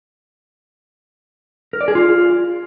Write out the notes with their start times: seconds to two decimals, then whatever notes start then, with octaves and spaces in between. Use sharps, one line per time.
1.73 A#4
1.81 D5
1.88 G#4
1.95 F4